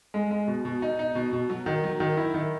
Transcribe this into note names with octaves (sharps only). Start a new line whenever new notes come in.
G#3
G#3
B2
B2
D#4
D#4
B2
B2
F#3
D#3
F#3
D#3
E4
D#3